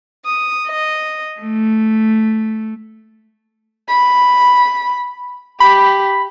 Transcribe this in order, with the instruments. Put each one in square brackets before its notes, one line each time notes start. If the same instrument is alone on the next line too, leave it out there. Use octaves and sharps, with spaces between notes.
[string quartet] D#6
D#5
A3
[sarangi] B5
[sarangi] G4 [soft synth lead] B5